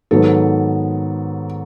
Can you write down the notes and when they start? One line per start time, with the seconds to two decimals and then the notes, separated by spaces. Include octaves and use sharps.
0.11 G#2 D#3 F#3 B3 A4